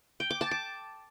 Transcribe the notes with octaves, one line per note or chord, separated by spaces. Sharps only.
G5
D6
A5
D6